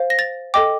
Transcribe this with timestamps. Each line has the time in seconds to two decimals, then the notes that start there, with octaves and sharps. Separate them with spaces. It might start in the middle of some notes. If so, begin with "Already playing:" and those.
Already playing: C5 F5
0.10 A#6
0.19 A6
0.54 A4 D#5 G5 D6